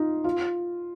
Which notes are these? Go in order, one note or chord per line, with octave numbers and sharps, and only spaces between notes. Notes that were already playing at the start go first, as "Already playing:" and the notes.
Already playing: D#4 F4
F4